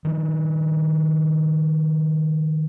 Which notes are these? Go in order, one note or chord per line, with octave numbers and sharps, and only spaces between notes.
D#3 F3